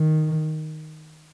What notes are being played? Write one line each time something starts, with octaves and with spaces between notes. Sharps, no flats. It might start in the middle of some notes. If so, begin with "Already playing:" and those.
Already playing: D#3